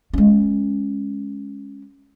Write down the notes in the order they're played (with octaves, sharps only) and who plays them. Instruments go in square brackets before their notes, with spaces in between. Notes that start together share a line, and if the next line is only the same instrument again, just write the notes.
[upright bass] G#3 C#4